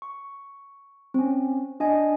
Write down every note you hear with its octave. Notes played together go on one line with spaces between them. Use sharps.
C#6
C4 C#4
D4 D#5 G#5